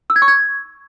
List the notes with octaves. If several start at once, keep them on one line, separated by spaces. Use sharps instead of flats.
E6
G#6
C#6
G#6